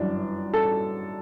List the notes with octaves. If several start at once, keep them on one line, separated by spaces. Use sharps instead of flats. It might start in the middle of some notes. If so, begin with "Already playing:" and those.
Already playing: G1 F#2 E3 D4
A4